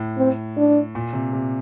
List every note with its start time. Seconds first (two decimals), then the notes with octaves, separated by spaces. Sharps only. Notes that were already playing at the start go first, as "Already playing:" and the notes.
Already playing: A2
0.18 C4
0.57 D4
0.95 A#2
1.13 C3
1.33 C3